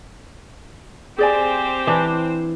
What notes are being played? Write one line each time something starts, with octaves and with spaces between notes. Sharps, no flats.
C4 G4 G#4 C5 D5 G#5
E3 D4